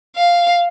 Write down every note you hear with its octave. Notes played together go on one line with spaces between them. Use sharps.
F5